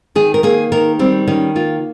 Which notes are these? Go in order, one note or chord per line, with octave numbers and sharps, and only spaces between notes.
D#3 G#4
A#4
A#3 G#4
D#3 A#4
G3 C4
D#3 C#4
A#3 F4